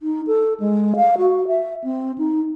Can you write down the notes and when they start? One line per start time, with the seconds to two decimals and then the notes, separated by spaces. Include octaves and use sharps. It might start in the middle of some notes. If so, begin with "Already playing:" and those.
0.01 D#4
0.27 A4
0.60 G#3
0.96 F5
1.18 F#4
1.48 E5
1.84 C4
2.18 D#4